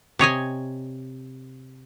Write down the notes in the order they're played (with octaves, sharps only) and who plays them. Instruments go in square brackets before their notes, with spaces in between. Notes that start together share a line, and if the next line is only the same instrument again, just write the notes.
[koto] C3 C#5 D#5 G#5